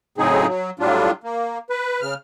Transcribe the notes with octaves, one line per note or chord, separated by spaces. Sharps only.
A2 C#3 F#3 C4 D#4 G#4
F#3
A2 F#3 G3 D4 F4
A#3
B4
C#3 F6